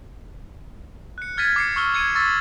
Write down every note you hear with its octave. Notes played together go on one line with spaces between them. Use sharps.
F#6 C#7
F6 G#6 A6 B6 D#7
D6 C7 C#7
C#6 E6 F6 G7
G#6 C#7 D#7
C#6 E6 A6 B6